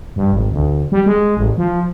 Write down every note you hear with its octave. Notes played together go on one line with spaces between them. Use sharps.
G2
G#1
D2
G3
G#3
A1
F3